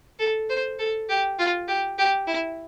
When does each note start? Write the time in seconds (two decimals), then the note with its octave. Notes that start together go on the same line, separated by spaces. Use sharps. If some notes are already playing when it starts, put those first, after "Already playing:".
0.19 A4
0.50 C5
0.79 A4
1.09 G4
1.39 F4
1.68 G4
1.98 G4
2.27 E4